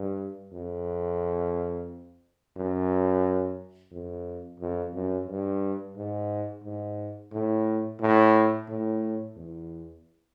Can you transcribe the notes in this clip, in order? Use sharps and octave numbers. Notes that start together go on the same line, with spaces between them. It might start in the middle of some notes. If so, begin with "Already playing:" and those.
Already playing: G2
F2
F#2
F2
F2
F#2
G2
G#2
G#2
A2
A2
A2
E2